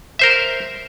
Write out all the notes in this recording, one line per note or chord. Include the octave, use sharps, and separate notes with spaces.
A#4 C5 E5